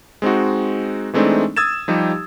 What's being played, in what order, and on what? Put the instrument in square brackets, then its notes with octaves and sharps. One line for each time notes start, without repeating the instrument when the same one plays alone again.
[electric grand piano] G#3 C4 D#4 F#4
E3 G#3 A3 C4 D4 D#4
D#6 E6 G#6 A6 E7
F3 G3 D#4 G4